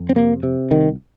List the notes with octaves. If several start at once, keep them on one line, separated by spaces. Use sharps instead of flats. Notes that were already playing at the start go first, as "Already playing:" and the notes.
Already playing: F2
C4
C3 A#3
C3
C2 D#3